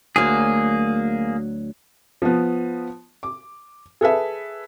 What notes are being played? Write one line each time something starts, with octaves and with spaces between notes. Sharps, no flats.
D2 F#3 A#3 G#4
F3 B3
D6
G#4 A4 B4 E5